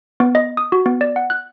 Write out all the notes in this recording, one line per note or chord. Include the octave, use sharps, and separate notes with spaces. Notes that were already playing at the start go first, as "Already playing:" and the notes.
B3
D#5
D#6
F#4
B3
D5
F#5
F#6